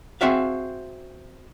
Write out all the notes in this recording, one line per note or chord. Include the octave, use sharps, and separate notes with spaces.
C4 F#4 G#4 E5 F5